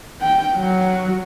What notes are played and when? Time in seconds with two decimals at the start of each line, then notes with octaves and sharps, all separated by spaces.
0.21 G5
0.57 F#3